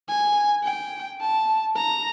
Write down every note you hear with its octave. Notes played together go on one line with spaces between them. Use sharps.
G#5
G5
A5
A#5